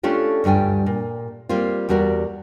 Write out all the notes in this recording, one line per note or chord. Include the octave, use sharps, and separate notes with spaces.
A3 C#4 D4 F4 G4
D2 G2 G3 G5 G#5
A#2
G3 A#3 C4 F4
E2 G3 F#4 A#4 D5